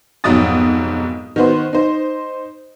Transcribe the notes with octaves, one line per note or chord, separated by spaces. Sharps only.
F1 B1 G#2 F#3 D#6 A6
D#3 B3 F#4 B4 C5
D#4 C5